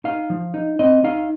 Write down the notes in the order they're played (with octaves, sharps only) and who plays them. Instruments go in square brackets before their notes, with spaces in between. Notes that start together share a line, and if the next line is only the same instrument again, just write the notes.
[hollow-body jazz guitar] D#4 F5
F3
D#4
C4 D#5
D#4 F5